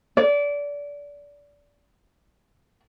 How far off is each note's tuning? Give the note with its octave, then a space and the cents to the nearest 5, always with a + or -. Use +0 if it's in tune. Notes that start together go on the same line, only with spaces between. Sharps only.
D5 -25